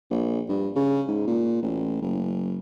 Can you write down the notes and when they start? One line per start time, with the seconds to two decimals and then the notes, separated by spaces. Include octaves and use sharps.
0.10 A#1
0.49 G2
0.75 C#3
1.08 G#2
1.27 A#2
1.63 A1
2.02 F#1